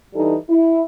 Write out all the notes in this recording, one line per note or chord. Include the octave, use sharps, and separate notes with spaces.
E3 G3 D#4 A4
E4